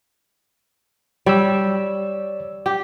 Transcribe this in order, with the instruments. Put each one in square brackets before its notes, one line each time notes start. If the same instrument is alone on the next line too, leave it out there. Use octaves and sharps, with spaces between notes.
[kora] G3 [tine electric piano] C#5 D5 E6
[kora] G4